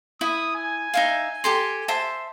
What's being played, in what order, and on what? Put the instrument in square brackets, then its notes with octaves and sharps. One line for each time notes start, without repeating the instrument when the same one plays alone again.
[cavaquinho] E4 [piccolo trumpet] D#6
[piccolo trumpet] G#5
[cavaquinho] D#4 E5 F5
G4 A4 C6
C5 E5 A5